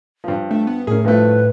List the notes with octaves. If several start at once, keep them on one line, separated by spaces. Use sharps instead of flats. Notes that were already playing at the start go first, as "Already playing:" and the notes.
G2 F3
A3 D4
B3
A2 C#4 G#4 A#4
G2 F3 A3 B4